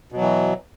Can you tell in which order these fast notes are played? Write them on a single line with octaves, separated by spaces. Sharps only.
B2 F#3 E3